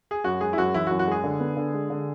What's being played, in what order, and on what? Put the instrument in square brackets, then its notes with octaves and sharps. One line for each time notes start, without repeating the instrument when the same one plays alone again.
[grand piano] G#4
[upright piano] F#2 [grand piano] F#4
[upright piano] G#3 [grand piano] G#4
[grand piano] E4
[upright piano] F#2 [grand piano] F#4
[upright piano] E3 [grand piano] E4
[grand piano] F#4
[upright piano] F#2
[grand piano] F#4
[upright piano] G#3 [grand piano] G#4
[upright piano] D3
B3
D3
G#3
D3